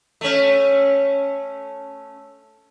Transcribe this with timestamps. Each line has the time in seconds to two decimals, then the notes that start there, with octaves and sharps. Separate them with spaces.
0.21 A3 C#4